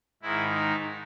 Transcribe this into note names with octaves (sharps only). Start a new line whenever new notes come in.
G#2 D#3 E4
D#4